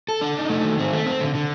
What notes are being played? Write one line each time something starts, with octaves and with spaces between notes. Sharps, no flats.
A4
D4
D#4
A3
D#3
C4
A3
C4
D3
D3